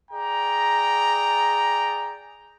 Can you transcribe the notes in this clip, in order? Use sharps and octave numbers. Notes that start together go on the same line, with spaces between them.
G#4 D5 G5 A#5